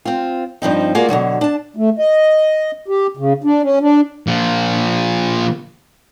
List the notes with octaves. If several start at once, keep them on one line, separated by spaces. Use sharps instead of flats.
C4 F4
G2 F3 C4 D#4
A#3 F4 F#4 G#4 D5
B2 D3 F3 F#3
D4 A5
A3
D#5
G4
C#3
D4
C#4
D4
A#2 F3